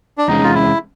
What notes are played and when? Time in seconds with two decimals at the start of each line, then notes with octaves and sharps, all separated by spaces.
0.18 D4
0.27 E2 C3 D#3 G#3 C#4 D#4
0.44 F4
0.55 E4